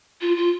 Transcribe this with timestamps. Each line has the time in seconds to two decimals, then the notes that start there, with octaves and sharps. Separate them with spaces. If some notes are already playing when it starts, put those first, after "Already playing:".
0.21 F4
0.37 F4